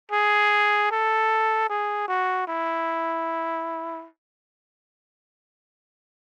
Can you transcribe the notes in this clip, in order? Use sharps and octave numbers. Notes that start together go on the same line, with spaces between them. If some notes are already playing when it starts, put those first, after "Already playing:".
G#4
A4
G#4
F#4
E4